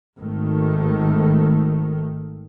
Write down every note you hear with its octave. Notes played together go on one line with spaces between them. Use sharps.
G#1 D#3 A3